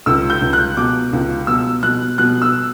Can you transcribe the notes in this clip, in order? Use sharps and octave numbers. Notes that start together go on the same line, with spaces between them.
C#2 E6
G6
C#2
F#6
B2 D6
C#2
B2 E6
B2 F#6
B2 F#6
E6